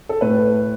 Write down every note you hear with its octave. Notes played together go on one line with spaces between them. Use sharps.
A4
A2 B4